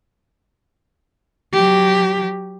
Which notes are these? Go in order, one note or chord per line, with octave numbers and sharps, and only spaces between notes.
F#3 G4